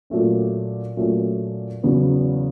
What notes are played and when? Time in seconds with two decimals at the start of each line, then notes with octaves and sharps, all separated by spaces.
0.10 A#2 F#3 A3 C#4
0.97 A#2 F#3 A3 C#4
1.83 E2 C#3 F#3 B3